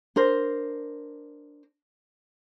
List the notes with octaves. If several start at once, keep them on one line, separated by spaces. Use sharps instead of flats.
D4 A#4 C5